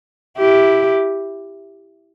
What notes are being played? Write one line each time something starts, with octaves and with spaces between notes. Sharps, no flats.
E4 G4